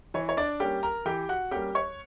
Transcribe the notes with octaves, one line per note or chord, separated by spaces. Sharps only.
E3 C#5
C#5
D4 D5
G3 A#3 C#4 G4 G5
A#4 A#5
E3 G4 G5
F#4 F#5
G3 A#3 C#4 G4 G5
C#5 C#6